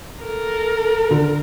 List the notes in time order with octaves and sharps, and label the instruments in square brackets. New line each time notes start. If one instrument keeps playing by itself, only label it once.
[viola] A4 A#4
[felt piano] D3